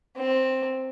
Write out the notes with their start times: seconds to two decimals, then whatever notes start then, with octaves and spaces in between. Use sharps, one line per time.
0.17 C4